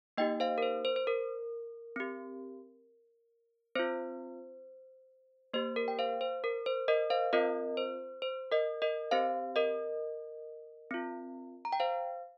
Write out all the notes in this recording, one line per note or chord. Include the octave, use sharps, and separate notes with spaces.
A#3 D#4 G4 D#5 G5
C5 F5
A#4
C5
C5
C5
A#4
C4 G4
C4 F4 C5
A#3 G4 C5
A#4
G5
C5 F5
C5
A#4
C5
A#4 D#5
C5 F5
C4 F4 A#4 D#5
C5
C5
A#4 D#5
A#4 D#5
C4 G4 C5 F5
A#4 D#5
C4 F4
A#5
G5
C5 F5